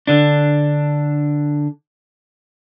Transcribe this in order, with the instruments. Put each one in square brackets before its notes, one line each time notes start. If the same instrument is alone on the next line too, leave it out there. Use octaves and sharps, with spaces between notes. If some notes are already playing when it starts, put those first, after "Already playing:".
[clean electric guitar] D3 D4